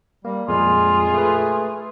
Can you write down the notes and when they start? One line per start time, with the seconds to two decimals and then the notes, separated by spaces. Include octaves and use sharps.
0.25 G3 A#3
0.48 F2 A#2 G#3 F4 G#4
1.14 A3 B4